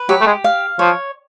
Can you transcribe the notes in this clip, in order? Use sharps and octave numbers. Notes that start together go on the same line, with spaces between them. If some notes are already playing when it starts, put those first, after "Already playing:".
Already playing: B4
F#3 G4
A3
G#3
F5
F3 C#5